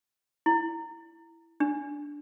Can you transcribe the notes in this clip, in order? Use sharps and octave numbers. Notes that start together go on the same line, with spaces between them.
E4
D4